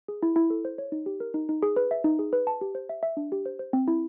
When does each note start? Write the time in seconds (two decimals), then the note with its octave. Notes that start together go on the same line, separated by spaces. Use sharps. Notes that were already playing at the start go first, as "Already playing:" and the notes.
0.08 G#4
0.23 E4
0.36 E4
0.50 A4
0.65 C5
0.78 C#5
0.92 D#4
1.06 G4
1.20 A#4
1.34 D#4
1.49 D#4
1.63 G#4
1.76 B4
1.91 E5
2.04 D#4
2.19 G#4
2.33 B4
2.47 A5
2.61 G4
2.75 C5
2.89 E5
3.03 E5
3.17 D4
3.32 G4
3.46 C5
3.59 C5
3.73 C4
3.88 E4